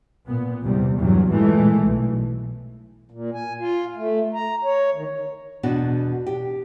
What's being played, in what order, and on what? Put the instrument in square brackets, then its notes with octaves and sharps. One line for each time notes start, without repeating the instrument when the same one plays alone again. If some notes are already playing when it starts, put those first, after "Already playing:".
[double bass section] A#2 B3
E2 C3 G3
E2 G2 E3 F#3
A#2 E3 G#3 A3
B1
[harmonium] A#2
G#5
F4
A3
A#5
C#5
D#3
[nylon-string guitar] E2 B2 D4 F#4
G4